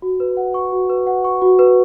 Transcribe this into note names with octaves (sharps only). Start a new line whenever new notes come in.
F#4
B4
F#5
C#6
F#4
B4
F#5
C#6
F#4
B4